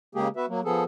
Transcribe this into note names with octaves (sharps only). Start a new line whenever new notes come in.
C#3 G#3 A#3 G4 G#4
B3 F#4 B4 E5
F#3 A#3
F3 B3 G#4 A4